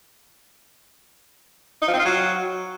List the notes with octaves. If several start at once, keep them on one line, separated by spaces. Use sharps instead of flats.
D#4
F3
C4
F4
F#3